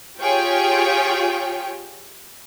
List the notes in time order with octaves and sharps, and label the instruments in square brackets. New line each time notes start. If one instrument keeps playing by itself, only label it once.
[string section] F4 G4 G#4 C#5 G5